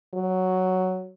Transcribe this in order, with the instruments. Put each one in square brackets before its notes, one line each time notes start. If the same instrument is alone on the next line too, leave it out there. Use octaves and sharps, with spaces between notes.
[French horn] F#3